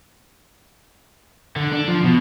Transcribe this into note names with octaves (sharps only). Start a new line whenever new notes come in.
D3
D4
F3
B2